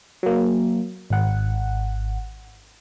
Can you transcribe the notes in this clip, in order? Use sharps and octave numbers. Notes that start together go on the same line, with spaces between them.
F#3 A#3
G#1 F#5